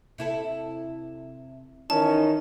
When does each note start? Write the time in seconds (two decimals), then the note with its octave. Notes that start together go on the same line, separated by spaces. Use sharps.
0.18 C3 E4 A4
1.90 D#3 E3 C#4 D#4 A5